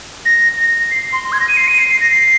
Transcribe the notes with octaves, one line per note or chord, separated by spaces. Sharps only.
A#6
A#6
C7
C6
C6
G#6
A#6
D#7
C7
D#7
C7
C7
A#6
C7